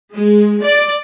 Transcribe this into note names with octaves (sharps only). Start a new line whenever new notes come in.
G#3
D5